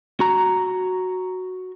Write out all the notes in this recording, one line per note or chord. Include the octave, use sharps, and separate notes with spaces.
F#4 A#5